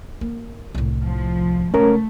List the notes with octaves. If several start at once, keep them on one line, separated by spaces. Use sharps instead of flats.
A#3
C2 A2
F3
C#3 G#3 A3 C#4 A#4